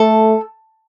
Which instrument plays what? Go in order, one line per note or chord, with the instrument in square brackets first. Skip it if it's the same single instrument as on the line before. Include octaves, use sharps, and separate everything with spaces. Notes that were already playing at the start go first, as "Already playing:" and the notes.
Already playing: [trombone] A3 [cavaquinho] A4